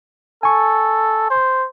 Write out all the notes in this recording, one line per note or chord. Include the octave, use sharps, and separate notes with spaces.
A4 G#5 C#6
C5